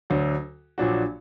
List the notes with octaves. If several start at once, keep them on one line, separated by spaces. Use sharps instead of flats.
D2 D3 F#3
A#1 A#2 F#3 D4 F#4